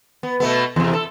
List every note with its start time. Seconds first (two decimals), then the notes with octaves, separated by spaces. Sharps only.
0.23 B3
0.40 B2 A3 B3
0.76 E2 C3
0.93 A4